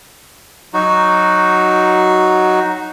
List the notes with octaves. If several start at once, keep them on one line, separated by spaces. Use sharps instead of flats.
F#3 D#4 F#4